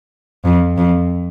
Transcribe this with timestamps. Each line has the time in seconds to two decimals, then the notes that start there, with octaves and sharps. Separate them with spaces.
0.45 F2
0.77 F2